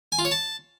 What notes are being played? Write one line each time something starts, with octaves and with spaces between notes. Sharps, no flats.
G#5
F4
C#5
A5